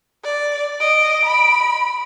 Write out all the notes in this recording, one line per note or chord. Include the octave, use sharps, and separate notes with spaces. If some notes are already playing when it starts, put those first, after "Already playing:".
D5
D#5 D7
B5